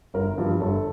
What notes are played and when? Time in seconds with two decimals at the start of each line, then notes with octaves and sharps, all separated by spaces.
0.14 G1 A#4
0.38 G2 F3
0.60 G1 A4